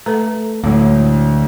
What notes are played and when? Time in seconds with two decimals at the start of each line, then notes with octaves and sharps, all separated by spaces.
0.06 A3 A4 B4 A#5
0.64 D2 A2 D3 F#3 G#3 E4